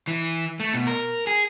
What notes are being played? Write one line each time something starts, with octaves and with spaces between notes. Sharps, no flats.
E3
A3
B2
A#4
G#4